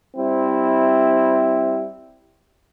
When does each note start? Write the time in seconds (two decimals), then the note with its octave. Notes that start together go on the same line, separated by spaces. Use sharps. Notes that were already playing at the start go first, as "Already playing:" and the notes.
0.17 G3 C4 E4